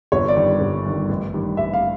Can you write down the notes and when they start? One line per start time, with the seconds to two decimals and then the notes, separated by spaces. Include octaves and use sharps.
0.12 G1 C#5
0.28 D5
0.36 G2 D#3
0.61 G1
0.85 G2 D#3
1.09 A1
1.34 G2 D#3
1.57 A1 E5
1.73 F5